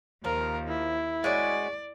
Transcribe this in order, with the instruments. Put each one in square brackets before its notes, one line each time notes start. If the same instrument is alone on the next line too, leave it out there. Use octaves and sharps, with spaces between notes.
[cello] D#2 [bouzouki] F3 [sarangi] A#4
[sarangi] E4
[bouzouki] G#3 C#4 F#4 [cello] D5